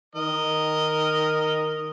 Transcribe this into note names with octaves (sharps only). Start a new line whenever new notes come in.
D#3 A#4 D#5